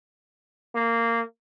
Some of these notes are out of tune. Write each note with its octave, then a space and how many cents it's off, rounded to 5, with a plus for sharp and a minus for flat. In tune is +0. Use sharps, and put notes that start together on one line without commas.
A#3 -15